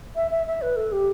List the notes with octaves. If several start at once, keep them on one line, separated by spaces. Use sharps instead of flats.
E5
E5
E5
B4
A4
G4